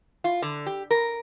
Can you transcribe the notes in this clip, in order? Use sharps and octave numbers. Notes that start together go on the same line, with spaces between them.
F4
D3
G4
A#4